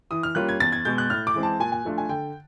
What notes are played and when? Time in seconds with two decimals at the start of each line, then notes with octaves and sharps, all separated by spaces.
0.11 E3 D#6
0.23 F6
0.35 G3 A#3 C#4 F4 F#6
0.49 G#6
0.60 E2 A6
0.72 G#6
0.85 B2 G#3 G6
0.98 F#6
1.10 A2 F6
1.27 D6
1.34 E3 G#3 C4
1.43 A5
1.60 A#2 G#5
1.72 G#5
1.85 F3 A3 D4 F4
1.98 G#5
2.09 D3 G5